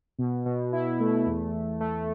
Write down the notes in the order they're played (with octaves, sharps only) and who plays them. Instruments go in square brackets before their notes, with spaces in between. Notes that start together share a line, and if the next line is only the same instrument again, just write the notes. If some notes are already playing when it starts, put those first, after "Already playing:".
[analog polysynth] B2
B2
E4
A3
E2
E2
A3